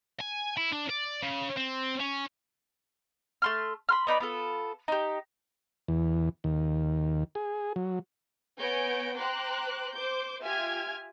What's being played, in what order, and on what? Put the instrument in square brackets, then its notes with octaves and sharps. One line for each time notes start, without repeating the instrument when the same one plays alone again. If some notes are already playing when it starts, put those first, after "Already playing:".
[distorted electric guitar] G#5
E4
D4
D5
C#3
C4
C#4
[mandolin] A3 C6 F6
B5 C6 F6
B3 D#4 D5 B5
B3 F4 A4
D#4 G4
[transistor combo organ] E2
D#2
G#4
F#3
[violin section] B3 C#5 G#5 G6 A#6 D7
C5 G5 A#5 C6 D6 F#6
C5 D6 G6
F4 G4 E5 G#5 F6 G#6